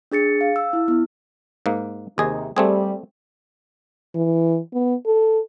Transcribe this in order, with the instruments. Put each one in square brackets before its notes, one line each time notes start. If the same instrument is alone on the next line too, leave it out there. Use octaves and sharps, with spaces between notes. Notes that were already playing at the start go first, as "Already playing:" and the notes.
[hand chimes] D4 G#4 A6 C#7
F5
E6
E4
B3 E4
[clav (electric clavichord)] G#2 A#3
[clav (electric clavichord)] D#2 G#4 D#5 [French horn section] C3 D#4
[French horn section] G3 [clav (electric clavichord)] A3 C4 G#4
[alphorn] E3
B3
A4